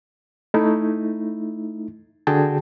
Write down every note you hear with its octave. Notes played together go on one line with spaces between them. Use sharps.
A3 D#4 E4
D3 F#4 G#4 G5 A5